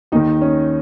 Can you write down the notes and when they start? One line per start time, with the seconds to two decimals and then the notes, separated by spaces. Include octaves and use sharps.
0.12 D#2 D#3 D#4
0.41 C#4